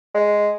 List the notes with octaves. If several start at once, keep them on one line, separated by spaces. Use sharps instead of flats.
G#3